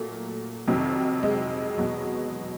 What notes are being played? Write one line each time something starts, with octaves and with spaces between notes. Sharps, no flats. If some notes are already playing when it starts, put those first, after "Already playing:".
Already playing: A#2 F#3 A3 A#3
F2 C3 D#3 F#3
G#3
E2 B2 F#3